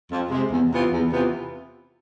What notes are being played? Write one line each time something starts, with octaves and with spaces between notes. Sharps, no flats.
F2
C3 G#3
E2
C3 E3 B3 F4
E2
C3 E3 B3 F4